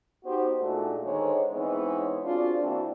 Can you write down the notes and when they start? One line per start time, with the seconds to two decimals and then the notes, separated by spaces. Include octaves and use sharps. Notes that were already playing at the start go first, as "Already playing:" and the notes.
0.25 B3 D#4 F#4 G4 C5
0.59 A#2 G#3 A3 D4 D#4 F#4
1.04 D3 D#3 G#3 A#4 C5 C#5
1.52 E3 G#3 B3 C4 D#4 C#5
2.23 C4 D4 F4 F#4 G#4 D5
2.59 E3 A#3 C4 D4 F#4 A#4